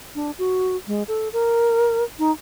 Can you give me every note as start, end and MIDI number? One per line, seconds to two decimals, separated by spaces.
0.15 0.31 62
0.38 0.76 66
0.87 1.03 56
1.08 1.28 69
1.33 2.04 70
2.19 2.31 63